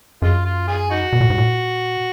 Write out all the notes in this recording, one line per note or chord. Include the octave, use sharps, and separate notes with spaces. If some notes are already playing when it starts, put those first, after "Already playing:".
F#2 G#3 F4
F4
F4 G#4
D#4 F#4
B2
A#2
G#2
A#2